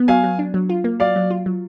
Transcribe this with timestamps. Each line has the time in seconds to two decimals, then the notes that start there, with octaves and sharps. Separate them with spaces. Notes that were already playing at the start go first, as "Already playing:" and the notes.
Already playing: B3
0.08 F#3 F5 G#5
0.23 F#3
0.39 D4
0.54 F#3
0.69 F4
0.84 A#3
1.00 F#3 D5 F5
1.16 F#3
1.31 F4
1.46 F#3